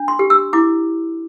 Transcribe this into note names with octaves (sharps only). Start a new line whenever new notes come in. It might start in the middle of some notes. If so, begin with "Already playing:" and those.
Already playing: D4
C6
G4
E6
E4 D6